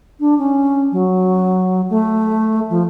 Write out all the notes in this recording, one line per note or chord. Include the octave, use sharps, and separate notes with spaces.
D4
C#4
F#3
A3
F3